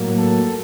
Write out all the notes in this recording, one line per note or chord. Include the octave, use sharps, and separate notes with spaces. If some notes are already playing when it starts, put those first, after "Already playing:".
Already playing: A2 F#3 A#3
A4